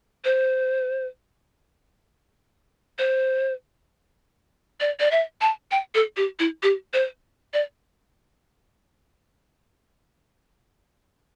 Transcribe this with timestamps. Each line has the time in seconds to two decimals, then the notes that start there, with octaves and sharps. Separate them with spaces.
0.25 C5
2.99 C5
4.80 D5
5.00 D5
5.11 E5
5.41 A5
5.71 G5
5.95 A4
6.17 G4
6.39 E4
6.63 G4
6.93 C5
7.53 D5